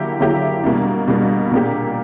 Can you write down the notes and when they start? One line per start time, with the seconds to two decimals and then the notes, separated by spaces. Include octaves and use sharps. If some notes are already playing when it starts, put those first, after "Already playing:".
Already playing: D3 F#3 A#3 E4 G4
0.20 D3 F#3 A#3 E4 G4
0.64 B2 G3 A#3 D4
1.08 B2 G3 A#3 D4
1.52 A#2 A#3 D4 G4